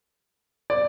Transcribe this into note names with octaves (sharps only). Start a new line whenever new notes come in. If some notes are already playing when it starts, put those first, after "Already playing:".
D5